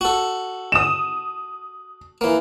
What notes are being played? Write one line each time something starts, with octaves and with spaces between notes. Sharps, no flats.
F#4 A4
D#6 E7
E3 A#3